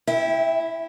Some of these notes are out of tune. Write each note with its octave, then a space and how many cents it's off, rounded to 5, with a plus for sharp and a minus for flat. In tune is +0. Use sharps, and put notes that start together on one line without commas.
E4 +0 E5 -30 G5 +15